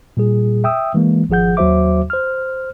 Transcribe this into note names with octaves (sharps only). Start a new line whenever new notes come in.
A#2 G3 G#4
E5 G5 D#6 E6
E3 G#3 A#3
G#1 F3 G#4 F#5 G6
D#2 F#3 F#4 C5 E5 D6
C5 F6